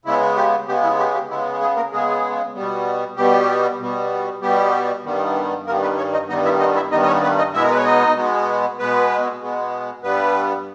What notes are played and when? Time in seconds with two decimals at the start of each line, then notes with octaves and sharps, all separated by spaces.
0.05 C#3 G#3 B3 E4
0.36 G4
0.68 C#3 G#3 B3 G4
0.83 E4
0.99 G4
1.14 G4
1.30 C#3 G#3 B3 E4
1.61 G#3 G#4
1.76 A#3 A#4
1.92 C#3 G#3 B3 G#4
2.55 B2 G3 B3
3.17 B2 G3 B3 G4
3.79 B2 G3 B3
4.42 B2 G3 B3 G4
5.04 G2 D#3 G3 B3
5.66 G2 D#3 G3 A#3 B3 A#4
5.82 B3 B4
5.97 C#4 C#5
6.13 D#4 D#5
6.29 G2 D#3 G3 B3 D#4 D#5
6.44 E4 E5
6.60 D#4 D#5
6.75 E4 E5
6.91 G2 D#3 G3 B3 D#4 D#5
7.02 D#5
7.07 C#4 C#5
7.22 B3 B4
7.38 D#4 D#5
7.54 B2 G#3 B3 E4 E5
7.63 A#4
7.70 B4
7.78 C#5
7.85 D#4 D#5
8.16 B2 G#3 B3
8.78 B2 G#3 B3 B4
9.41 B2 G#3 B3
10.03 G2 G3 B3 B4